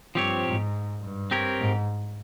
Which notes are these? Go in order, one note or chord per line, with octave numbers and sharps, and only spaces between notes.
G2 F3 C4 G4 C#5
G#2
G2
C4 G4 A#4 C#5
G#2